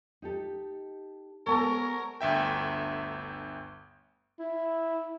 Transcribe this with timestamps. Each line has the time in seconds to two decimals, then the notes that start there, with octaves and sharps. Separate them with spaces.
0.22 D#4 G4 A4
1.47 G#3 B3 A4 A#4 C#5 G#5
2.21 G1 D2 E5 G5
4.39 E4